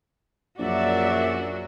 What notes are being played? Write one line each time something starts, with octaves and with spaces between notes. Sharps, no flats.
A#1 F#2 F#3 F#4 D5 E5